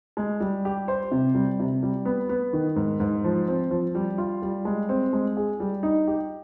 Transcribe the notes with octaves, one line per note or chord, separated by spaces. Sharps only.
G#3
G3
G4
C5
C3
G3
C3
G3
B3
B3
D#3
G#2
G#2
F3
C4
F3
G3
F4
G3
G#3
C4
G#3
G#4
G3
D#4
G4